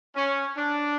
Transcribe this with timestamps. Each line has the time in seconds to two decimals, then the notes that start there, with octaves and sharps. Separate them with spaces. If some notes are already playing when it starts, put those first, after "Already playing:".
0.16 C#4
0.57 D4